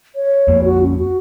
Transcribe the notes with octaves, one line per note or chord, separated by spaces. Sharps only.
C#5
F2 A#3
F#4
C#4
F#4